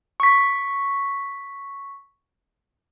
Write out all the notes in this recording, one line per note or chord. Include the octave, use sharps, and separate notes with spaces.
C#6 B6